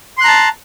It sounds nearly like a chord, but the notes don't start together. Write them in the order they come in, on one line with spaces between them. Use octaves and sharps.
C6 F#6 A#5 A5